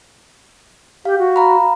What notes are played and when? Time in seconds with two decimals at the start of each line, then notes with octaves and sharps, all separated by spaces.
1.05 G4 F5
1.19 F#4
1.36 F5 A#5 B5